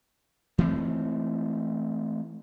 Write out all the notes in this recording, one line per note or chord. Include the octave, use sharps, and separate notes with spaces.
E3 A3 C4